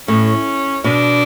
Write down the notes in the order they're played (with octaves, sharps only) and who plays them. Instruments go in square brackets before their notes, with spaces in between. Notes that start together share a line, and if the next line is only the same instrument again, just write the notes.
[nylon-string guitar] A2 [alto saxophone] C#4
[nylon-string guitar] B2 [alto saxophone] D4